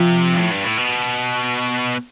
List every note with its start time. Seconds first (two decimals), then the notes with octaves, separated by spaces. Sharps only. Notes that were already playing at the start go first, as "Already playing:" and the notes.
Already playing: C3 F3 F4
0.33 G2
0.37 A2
0.51 G2
0.64 A2
0.77 B2